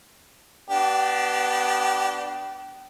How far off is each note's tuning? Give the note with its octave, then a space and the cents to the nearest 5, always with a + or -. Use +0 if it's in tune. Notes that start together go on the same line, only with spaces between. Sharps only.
B3 +0 D4 +0 G4 -30